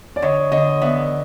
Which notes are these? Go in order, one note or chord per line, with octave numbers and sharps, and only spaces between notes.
D5
D3 C#5 D#5
D3 C#5 D#5
B3 D5 E5